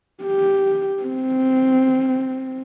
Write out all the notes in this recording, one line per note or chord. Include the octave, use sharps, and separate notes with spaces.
G4
C4